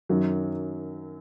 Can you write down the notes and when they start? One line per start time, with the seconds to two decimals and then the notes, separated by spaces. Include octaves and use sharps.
0.09 F#2 D#3 F#3